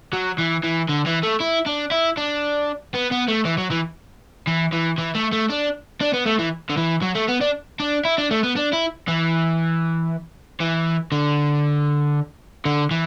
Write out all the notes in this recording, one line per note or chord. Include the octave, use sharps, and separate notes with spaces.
F#3
E3
E3
D3
E3
A3
E4
D4
E4
D4
B3
B3
A3
E3
F#3
E3
E3
E3
E3
A3
A3
D4
D4
B3
A3
E3
D3
E3
F#3
A3
B3
D4
D4
E4
D4
A3
B3
D4
E4
E3
E3
D3
D3
E3